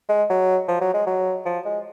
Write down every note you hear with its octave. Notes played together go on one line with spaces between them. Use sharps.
G#3
F#3
F3
F#3
G#3
F#3
F3
G#3